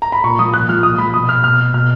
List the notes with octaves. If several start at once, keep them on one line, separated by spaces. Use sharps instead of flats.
A#5
B5
A#2 C#6
F3 D#6
A#2 F#6
F3 F6
A#2 D#6
F3 B5
B2 D#6
F6
B2 F6
B2 F6